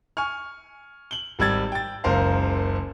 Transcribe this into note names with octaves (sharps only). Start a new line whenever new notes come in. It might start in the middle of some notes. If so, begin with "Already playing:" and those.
G#5 C#6 F6
F#7 G7
G#1 G3 E6 G#6 A6
G5 A6
F#1 C#2 A#4 C5 F5